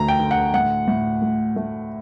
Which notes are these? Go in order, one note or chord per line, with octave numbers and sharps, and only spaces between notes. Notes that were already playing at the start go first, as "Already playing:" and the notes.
Already playing: D2 D3 A#5
G5
D3
F#5
A2 F#5
A2
A3
A3